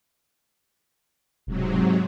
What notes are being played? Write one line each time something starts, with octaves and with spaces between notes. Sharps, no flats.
E1 G#2 C3 F#3